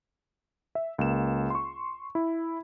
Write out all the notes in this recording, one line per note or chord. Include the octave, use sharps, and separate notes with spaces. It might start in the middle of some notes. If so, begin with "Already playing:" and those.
E5
C#2 A#3 E7
C6 C#6
E4